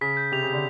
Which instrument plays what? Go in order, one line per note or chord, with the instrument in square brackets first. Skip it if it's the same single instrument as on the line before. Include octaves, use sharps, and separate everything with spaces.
[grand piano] C#3 [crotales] B6
[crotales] G6
[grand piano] C3 [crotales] F7
[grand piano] C#3
[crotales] F7
[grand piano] D3